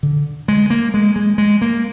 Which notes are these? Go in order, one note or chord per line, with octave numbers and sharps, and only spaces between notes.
D3
G#3
A#3
G#3
G#3
G#3
A#3